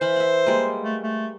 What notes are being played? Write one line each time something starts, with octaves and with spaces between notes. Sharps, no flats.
E3 C5 F5 B5
E5 F#5
G3 G#3 A#3
A3
A3